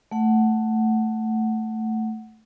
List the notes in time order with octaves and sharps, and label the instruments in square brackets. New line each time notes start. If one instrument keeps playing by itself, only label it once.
[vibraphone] A3 F#5